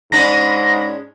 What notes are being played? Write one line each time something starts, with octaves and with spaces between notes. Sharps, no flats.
G#2 G#3 C#4 D4 B5 A#6